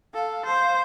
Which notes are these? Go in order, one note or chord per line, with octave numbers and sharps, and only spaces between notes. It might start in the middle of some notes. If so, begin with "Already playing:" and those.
A4 F5
C5